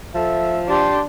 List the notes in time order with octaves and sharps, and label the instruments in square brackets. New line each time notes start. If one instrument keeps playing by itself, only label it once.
[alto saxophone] F3 [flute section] A4 [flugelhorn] E5
[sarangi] D4 [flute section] G4 C6 D6 [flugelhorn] A5